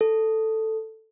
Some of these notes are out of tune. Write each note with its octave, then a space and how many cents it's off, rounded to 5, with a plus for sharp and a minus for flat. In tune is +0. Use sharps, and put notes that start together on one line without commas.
A4 +5